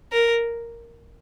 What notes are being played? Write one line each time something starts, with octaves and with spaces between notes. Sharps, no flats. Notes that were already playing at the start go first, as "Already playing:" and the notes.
A#4